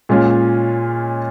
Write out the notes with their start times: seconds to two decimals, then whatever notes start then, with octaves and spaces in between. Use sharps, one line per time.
0.09 A#2 G#3 C#4 F4